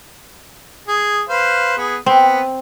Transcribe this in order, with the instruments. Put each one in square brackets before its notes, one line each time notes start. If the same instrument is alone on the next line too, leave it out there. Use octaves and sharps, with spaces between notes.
[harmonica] G#4
B4 C5 F5
B3 G#4
[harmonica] B3 [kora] C4